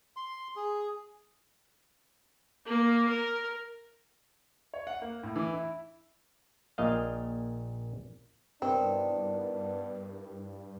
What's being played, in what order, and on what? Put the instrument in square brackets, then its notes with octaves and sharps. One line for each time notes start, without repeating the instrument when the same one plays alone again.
[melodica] C6
G#4
[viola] A#3
A#4
[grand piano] C#5
F#5
A#3
A2
E3
E4
[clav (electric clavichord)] A#1 A#2 D#5 F5
[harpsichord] C2 D#3 [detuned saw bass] G2 [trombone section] B3 D4 [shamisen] C4